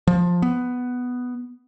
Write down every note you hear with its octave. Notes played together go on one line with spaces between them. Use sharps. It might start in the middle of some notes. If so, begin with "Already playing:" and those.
F3
B3